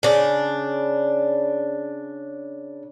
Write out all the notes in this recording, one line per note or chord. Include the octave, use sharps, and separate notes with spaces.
C#3 D4